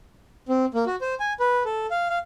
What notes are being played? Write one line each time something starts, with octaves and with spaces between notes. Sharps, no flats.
C4
A#3
F#4
C5
G#5
B4
A4
F5
F5